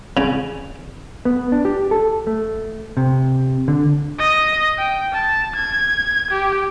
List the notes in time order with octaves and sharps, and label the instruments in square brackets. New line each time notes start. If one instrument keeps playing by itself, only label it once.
[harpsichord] C#3
[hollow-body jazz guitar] B3
D4
G4
A4
A3
C3
D3
[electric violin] D#5
G5
A5
G#6
G4